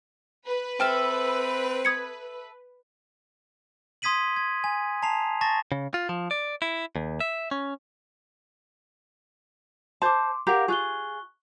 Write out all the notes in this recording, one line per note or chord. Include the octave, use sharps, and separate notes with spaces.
B4
C4 A4 E5 G5 F6 E7
D#6 G#6 C#7
C6 D#6 G#6 B6 D#7 F#7
G#6
G#5
A5 A#5 C7 F7
A5 C#6 A6 A#6
C#3
F4
F3
D5
E4
D#2
E5
C#4
C5 A5 C6 D6
G4 A#4 F5 F#5 D6
F4 G#4 C#6 F#6 G7